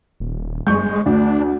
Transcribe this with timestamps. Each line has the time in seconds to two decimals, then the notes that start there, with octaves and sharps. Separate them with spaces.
0.20 D#1
0.67 G1 G#3 C#6 G6
1.06 D2 D4